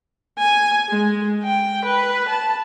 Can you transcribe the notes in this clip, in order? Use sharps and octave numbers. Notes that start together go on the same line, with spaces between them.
G#5
G#3
G5
B4
A5